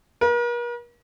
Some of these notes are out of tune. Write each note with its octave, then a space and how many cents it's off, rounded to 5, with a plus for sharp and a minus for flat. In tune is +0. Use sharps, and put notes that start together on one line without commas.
A#4 +45